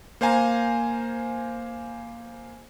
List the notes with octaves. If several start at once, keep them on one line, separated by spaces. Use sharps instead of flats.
A#3 C5 F5 G#5 A#5